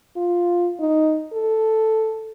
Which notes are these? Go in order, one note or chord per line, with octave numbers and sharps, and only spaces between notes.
F4
D#4
A4